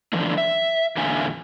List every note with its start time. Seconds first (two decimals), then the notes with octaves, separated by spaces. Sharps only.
0.13 D3 E3 F3 A3 D4
0.38 E5
0.96 E2 A#2 D3 E5 F5 G#5